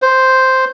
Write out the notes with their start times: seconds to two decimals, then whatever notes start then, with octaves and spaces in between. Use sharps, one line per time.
0.02 C5